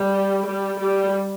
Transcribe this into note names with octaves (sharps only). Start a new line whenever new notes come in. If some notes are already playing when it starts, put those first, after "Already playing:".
Already playing: G3
G3
G3